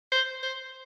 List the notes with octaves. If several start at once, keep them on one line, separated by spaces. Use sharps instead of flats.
C5
C5